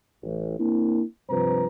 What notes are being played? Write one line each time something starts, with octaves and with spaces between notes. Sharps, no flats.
A1
A#3 C4 D4 E4
G2 C3 F3 B4 C5 A#5